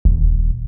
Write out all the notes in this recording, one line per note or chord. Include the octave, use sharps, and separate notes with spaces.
D#1